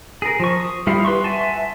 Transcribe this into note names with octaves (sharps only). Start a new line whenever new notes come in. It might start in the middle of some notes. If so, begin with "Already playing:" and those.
G#4 A#4
F3 C#6
D#6
G3 E4 F4 F5
B4 C6 C#6
E5 F#5 G#5 A5